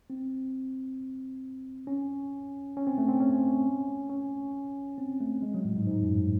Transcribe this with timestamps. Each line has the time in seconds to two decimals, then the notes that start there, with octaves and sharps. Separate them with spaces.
0.10 C4
1.87 C#4
2.77 C#4
2.87 C4
2.98 A3
3.08 C4
3.20 C#4
4.10 C#4
4.98 C4
5.21 A3
5.42 G#3
5.54 F#3
5.65 A2
5.76 G#2
5.87 G#2
6.02 F#2